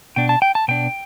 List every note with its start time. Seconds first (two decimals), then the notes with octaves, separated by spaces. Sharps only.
0.16 B2 B3 D4 G5
0.29 A5
0.42 G5
0.55 A5
0.68 B2 B3 D4 G5